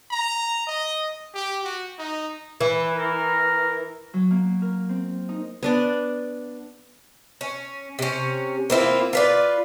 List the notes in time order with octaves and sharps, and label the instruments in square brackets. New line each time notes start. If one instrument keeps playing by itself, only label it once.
[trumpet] A#5
D#5
G4
F#4
D#4
[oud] E3
[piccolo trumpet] A#4
[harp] F#3
A#3
A#4
C4
D#4
[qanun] B3 D4 D5
[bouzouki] C#4
C3 C#4
A#3 C4 E4 F4
F4 B4 D5